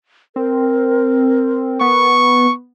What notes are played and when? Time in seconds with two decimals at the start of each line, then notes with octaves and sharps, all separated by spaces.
0.36 C4 A#4
1.81 B3 C#6